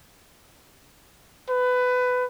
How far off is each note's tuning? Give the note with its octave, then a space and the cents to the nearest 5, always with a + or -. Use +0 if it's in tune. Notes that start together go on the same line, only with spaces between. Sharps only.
B4 +20